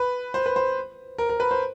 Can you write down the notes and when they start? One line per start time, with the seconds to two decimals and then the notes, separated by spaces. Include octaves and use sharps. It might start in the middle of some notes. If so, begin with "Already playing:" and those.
Already playing: B4
0.34 C5
0.46 B4
0.56 C5
1.18 A#4
1.29 A#4
1.40 B4
1.51 C5